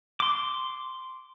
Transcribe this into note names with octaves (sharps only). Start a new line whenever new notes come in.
C6 D6